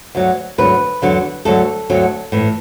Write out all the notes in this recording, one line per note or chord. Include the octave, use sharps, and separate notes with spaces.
D2 D3 F#3
D2 D3 F#3 B4
E2 D3 F#3
D2 D3 F#3 A4
D2 D3 F#3
A2 E3